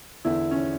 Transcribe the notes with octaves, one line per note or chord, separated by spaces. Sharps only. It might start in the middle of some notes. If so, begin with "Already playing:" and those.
E2 D3 E4
C#4